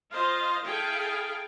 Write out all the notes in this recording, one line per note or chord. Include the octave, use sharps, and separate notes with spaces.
F4 C5 D#5 F5
E4 G#4 A4 F5 G5